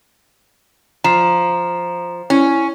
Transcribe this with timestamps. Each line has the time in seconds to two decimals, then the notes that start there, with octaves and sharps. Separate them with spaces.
1.04 F3 A#5 E7
2.30 C#4 E4